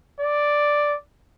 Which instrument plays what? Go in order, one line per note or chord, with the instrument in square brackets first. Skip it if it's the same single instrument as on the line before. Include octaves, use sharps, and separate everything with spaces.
[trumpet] D5